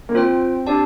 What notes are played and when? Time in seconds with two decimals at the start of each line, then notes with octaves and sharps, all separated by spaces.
0.09 A#3
0.15 C4 F4 C5 G5
0.67 D4 G4 D5 A5